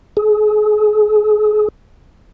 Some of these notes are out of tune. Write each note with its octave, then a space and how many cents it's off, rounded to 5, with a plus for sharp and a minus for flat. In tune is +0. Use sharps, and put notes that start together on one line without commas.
G#4 +35